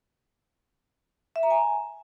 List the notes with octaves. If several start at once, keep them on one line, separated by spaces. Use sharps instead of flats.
E5
A#5
G#5